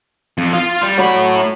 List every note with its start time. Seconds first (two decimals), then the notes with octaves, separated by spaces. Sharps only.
0.38 F2
0.53 F4 F5
0.82 G3
0.97 A2 F#3 B5